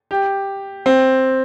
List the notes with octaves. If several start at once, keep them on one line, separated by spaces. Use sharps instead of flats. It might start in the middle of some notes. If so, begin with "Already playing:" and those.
G4
C4